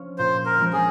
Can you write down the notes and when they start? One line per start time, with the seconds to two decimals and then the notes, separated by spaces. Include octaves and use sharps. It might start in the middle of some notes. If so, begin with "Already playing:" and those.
Already playing: F3 C#4
0.18 A#2 C5
0.46 A#4
0.59 F3 G#3 C#4
0.73 G#4